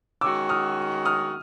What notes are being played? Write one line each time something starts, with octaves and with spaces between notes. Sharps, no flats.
D#3 G#3 C#4 F#4 D6 E6
D#6 F6
D#6 F6